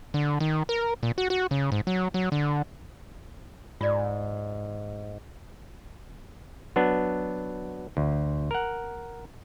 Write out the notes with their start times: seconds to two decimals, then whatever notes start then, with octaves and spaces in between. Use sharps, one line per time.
0.14 D3
0.40 D#3
0.69 A#4
1.03 A#2
1.18 F#4
1.30 F#4
1.51 C#3
1.72 G#2
1.87 F#3
2.14 F#3
2.32 D3
3.81 G#2 F4 D5
6.76 F#3 B3 D4
7.97 D2
8.51 A#4 F#5